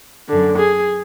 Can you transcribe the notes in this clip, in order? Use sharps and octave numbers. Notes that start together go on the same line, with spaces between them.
F#2 D3
G#4